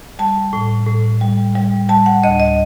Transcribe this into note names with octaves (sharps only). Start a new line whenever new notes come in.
G3 A5
A2
A2
G3
G3
G3 A5
F#5
D2 D#5
D#5